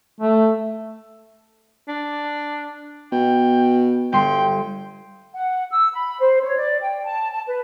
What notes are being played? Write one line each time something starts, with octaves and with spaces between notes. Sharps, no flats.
A3
D4
B2 G5
G1 G5 C6
F#5
E6
B5
C5
C#5
D5
G5
A5
A5
B4